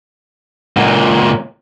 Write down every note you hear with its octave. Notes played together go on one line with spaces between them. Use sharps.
C#2 A#2